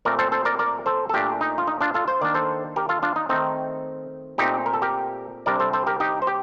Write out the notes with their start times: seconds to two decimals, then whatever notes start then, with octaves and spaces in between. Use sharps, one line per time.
0.05 A#2 A3 C4 A#4 D5
0.19 A4 C5
0.32 A4 C5
0.45 A#4 D5
0.59 A#4 D5
0.86 A4 C5
1.09 A4
1.13 A#2 A3 D4 G4 A#4
1.41 D#4
1.58 F4
1.67 D#4
1.81 D4 F4
1.94 F4 A4
2.08 C5
2.21 D#3 A#3 D4 D5
2.35 A4 C5
2.76 G4 A#4
2.89 F4 A4
3.03 D4 F4
3.16 D#4
3.29 D#3 A3 C4 D#4
4.38 A#2 A3 C4 D#4 G4
4.66 A#4
4.74 A4
4.82 G4 A#4
5.46 C3 G3 D4 A#4 D5
5.60 A4 C5
5.73 A4 C5
5.87 G4 A#4
6.00 D#4 G4
6.22 C5
6.27 G4